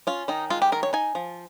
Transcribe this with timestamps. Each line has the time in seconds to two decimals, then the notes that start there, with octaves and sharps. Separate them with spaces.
0.07 C#4 F4
0.28 D#3 D#4
0.50 G#3 F4
0.62 G4
0.72 D#3 A#4
0.83 C#5
0.93 D#4 G#5
1.15 F3